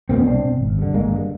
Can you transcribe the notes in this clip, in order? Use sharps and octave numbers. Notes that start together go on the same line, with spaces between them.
B2 A#3 C4
B3 C#4
C2 C4 D4
B2
G#1
G2 D3
G#1 G#3 A#3
G2 D3